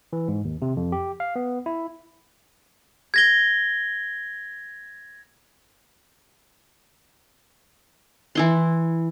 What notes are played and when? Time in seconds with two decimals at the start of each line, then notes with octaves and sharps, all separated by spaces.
0.13 E3
0.28 G#2
0.45 D#2
0.62 C3
0.77 F2
0.92 G4
1.20 F5
1.36 B3
1.66 E4
3.14 G#6 A#6 G7
8.35 E3 E4 C6